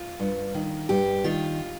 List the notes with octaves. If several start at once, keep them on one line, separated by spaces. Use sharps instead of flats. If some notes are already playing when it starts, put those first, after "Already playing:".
Already playing: F4
G2
D#3
G2 G4
D#3 F4